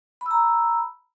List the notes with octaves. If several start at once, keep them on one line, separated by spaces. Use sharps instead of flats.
A#5 B5 E6